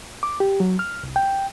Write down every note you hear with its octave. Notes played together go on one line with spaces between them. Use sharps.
D6
G4
F#3
F6
C2
G5